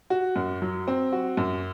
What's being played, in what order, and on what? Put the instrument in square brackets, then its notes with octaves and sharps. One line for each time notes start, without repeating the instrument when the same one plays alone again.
[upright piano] F#4
F#2
F#3
C4
F#4
F#2